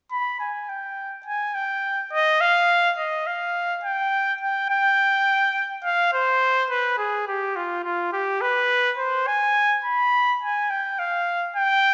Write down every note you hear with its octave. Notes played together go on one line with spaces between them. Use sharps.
B5
G#5
G5
G#5
G5
D#5
F5
D#5
F5
G5
G5
G5
F5
C5
B4
G#4
G4
F4
F4
G4
B4
C5
G#5
B5
G#5
G5
F5
G5